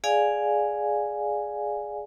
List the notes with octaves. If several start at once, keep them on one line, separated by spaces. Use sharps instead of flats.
G#4 D5 F5 G#5